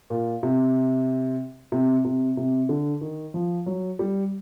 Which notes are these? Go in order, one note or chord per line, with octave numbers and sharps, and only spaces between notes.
A#2
C3
C3
C3
C3
D3
D#3
F3
F#3
G3